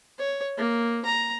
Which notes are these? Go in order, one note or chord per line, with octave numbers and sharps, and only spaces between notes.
C#5
A#3
A#5